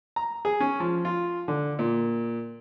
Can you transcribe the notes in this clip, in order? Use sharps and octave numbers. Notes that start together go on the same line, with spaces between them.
A#5
G#4
C#4
F3
F4
D3
A#2